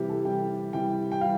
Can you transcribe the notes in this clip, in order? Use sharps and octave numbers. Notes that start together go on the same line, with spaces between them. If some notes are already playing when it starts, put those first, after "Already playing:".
Already playing: C3 E3 G3 G4
A4
C3 E3 G3 G5
C3 E3 G3 G5
G5
E3 G3 F5